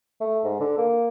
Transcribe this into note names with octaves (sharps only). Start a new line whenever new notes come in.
A3
G#2
D3
A#3